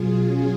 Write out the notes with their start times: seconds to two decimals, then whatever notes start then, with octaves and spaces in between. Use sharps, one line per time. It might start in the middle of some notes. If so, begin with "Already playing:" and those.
Already playing: B2 F#3 F4 G#4
0.24 C#4 F4